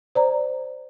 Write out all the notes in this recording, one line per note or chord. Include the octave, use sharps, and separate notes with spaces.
C5 D5 A#5